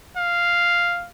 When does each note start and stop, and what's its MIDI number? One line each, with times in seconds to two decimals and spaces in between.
0.17 1.07 77